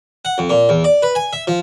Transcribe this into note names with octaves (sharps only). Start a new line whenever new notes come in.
F#5
F2
A#2
E2
D5
B4
G#5
E5
F3